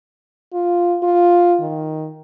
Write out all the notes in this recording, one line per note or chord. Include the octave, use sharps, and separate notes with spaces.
F4
F4
D#3